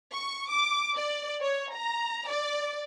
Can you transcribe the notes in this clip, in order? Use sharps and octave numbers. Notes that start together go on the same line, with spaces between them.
C#6
D6
D5
C#5
A#5
D5